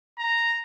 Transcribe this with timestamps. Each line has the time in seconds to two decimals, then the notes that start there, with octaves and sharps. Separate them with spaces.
0.19 A#5